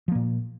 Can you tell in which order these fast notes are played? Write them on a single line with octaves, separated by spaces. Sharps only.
F3 A#3 A#2